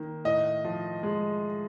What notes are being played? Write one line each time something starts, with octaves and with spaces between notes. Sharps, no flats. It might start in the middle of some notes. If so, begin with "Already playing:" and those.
Already playing: D#3 A#3
A2 D#5
F3
G#3